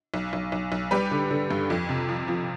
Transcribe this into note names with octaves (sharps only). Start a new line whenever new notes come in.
B1
B1
B1
B1
G3 G4 B4
D3
D3
G2
F2
C3
F3
F3